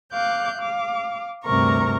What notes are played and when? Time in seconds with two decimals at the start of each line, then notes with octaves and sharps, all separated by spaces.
0.13 F5 D6 F#6 G6
0.57 F5 D6
1.44 D2 G2 C3 A#4 A#5 C#6